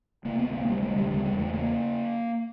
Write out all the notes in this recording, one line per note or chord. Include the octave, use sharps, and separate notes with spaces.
C3 A#3
B3
D2
A#3
C3 G3
G#3
D2
G3
C#3 G3
G#3
E2
A3
C#3 A#3